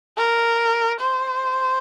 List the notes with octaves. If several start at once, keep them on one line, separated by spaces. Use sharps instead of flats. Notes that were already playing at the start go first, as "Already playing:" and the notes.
A#4
C5